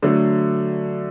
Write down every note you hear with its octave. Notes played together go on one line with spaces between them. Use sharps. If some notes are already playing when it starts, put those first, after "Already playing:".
D3 F#3 A3